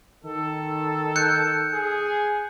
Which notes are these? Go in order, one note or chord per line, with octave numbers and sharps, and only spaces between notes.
D#3 A4
F#6 G6 C#7
G#4